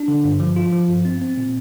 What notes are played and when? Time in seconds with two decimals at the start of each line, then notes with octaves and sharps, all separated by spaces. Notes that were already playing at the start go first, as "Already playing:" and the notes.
Already playing: D4
0.08 D3
0.24 G2
0.40 F3
0.56 F4
0.73 F3
0.88 G2
1.05 C4
1.22 C4
1.38 A#2